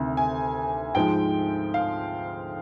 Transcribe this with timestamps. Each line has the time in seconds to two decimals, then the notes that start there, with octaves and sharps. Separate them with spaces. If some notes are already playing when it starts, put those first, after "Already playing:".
Already playing: D2 C3 D#3
0.17 G#5
0.95 G#2 F3 G#3 G5
1.74 F5